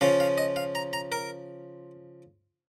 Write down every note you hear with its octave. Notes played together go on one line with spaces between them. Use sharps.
C#3 F3 C#4 F4 F5
F5
D#5
F5
A#5
A#5
A#4